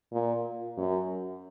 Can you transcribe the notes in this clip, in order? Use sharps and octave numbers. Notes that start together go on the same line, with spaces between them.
A#2
F#2